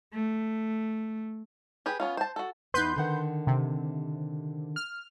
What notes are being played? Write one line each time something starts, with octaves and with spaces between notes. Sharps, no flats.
A3
G4 G#4 B4
B3 C#4 F4
C5 A5
F#4 A4
E2 B3 D#4 B4 C6 G6
D3 D#3 F#5
C3
F6